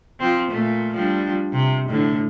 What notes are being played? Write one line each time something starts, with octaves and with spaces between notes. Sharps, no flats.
F3 C4
A#2 A3
F3 G3 D4
C3
A2 D3